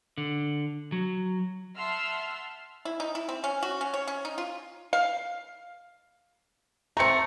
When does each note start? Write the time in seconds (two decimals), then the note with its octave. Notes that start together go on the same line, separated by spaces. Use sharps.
0.18 D3
0.92 F#3
1.76 E5 F#5 A5 C6 E6 F6
2.85 E4
3.00 D#4
3.15 E4
3.29 C4
3.44 C#4
3.63 F#4
3.81 C#4
3.94 C#5
4.07 C#4
4.25 D#4
4.38 F4
4.93 F5
6.97 A3 C4 A#5 C#7